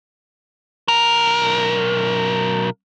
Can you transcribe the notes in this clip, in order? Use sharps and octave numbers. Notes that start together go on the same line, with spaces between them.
B1 A#4